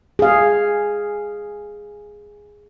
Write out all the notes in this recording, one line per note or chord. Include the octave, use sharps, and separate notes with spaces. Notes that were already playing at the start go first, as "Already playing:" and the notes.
G#4 F5